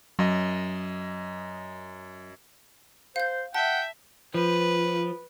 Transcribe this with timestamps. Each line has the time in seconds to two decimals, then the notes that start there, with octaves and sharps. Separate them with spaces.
0.19 F#2 F#3 D#5
3.16 C5 F5 G6
3.54 E5 F#5 G5 A5
4.34 F3 B4